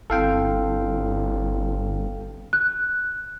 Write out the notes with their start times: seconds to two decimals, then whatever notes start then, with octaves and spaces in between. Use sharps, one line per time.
0.10 G1 C4 E4 A4 F5 G5
2.53 F#6